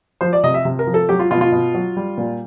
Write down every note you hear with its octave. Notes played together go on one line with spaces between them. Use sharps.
F3 C5
D5
C3 D#5
E5
C3
A#4
F3
A4
F#3 G4
F4
B2 F4
F4
B2
F#3
G3
A#2